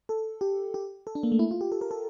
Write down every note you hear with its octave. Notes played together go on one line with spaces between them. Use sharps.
A4
G4
G4
A4
D4
A#3
A3
E4
F4
G4
A4
A#4
A4